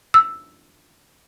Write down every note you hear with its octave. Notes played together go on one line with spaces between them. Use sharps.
E6